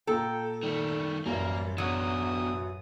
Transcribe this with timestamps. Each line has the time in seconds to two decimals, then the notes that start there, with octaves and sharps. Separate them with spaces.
0.07 A#2 A4 G5 A#5
0.63 D#3 G3 A3
1.26 A1 F#2 G3 A#3
1.78 B2 F#3 D4 D#6